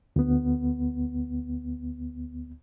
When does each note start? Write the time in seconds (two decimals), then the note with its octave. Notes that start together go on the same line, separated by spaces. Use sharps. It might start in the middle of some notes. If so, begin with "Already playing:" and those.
0.16 D2 B3